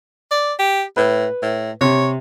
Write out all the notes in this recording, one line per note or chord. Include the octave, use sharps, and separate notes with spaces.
D5
G4
A2 B4
A2
C3 C#5